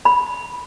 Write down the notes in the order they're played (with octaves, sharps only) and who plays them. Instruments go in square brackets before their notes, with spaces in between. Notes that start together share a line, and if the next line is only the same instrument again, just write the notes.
[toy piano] B5